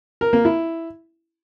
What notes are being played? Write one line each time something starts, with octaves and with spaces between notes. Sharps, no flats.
A#4
A#3
E4